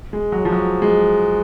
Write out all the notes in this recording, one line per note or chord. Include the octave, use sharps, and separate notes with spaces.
G#3
F#3
F3
F#3
G#3